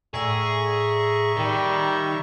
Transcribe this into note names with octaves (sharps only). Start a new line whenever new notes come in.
A2 G#4 D5 E5 A#5 C#6 E6
D#3 G3